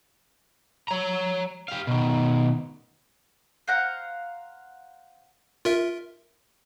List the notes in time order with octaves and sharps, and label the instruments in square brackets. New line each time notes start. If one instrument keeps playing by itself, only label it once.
[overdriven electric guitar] C#5 A#5
G4 F5
B2 D#3
[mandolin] C5 F5 F#5 A#5
[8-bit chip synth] F4 A#4 E5